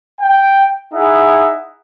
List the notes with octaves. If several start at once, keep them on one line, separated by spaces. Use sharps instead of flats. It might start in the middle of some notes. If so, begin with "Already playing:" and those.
G5
D#4 E4 G#4 E5 F#5